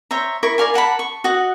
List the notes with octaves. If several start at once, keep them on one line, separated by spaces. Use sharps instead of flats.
C5 C#5 E5 A#5
E4 A#4 C#6
A#4 D5 F5 G#5
A#4 F#5 A5 B5
C#6
F#4 D#5 F#5